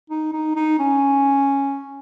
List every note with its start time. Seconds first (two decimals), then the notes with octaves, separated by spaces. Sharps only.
0.10 D#4
0.33 D#4
0.56 D#4
0.79 C#4